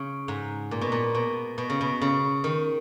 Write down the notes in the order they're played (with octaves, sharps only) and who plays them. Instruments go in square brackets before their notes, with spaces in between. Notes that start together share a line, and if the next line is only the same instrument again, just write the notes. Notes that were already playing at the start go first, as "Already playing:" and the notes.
Already playing: [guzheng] C#3
G#2
A#2
B2
A#2
B2
B2
C#3
B2
C#3
D#3